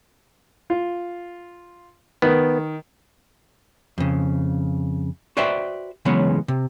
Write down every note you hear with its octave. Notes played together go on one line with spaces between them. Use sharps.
F4
D#3 B3
F2 C#3
F#4 B4 C5 D5 E5 G5
C#3 E3 F#3 G#3 B3 C#4
C3